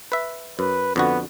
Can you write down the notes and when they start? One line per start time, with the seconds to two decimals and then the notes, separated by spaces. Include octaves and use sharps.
0.12 B4 E5
0.59 F#2 B4
0.96 F2 D3 B3 F#4